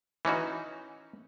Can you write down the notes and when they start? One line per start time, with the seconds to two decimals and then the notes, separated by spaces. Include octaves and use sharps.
0.25 E3 C#4 D#4 F#4